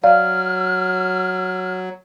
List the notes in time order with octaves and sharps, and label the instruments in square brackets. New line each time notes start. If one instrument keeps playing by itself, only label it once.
[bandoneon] F#3 [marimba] D5 F5 [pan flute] F6